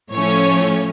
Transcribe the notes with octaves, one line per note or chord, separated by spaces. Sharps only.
A2 F3 A3 C#4 C#5